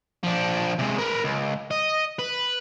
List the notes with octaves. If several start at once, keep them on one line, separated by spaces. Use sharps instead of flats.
F3 D4
C3 G#3
A#4 B4
C#2
D#5
B4